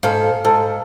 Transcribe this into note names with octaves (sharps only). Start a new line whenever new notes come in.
G#2 A4 F5
G#2 A4